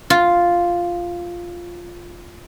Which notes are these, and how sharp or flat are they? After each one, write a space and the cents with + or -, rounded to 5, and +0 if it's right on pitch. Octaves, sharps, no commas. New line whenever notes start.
F4 +0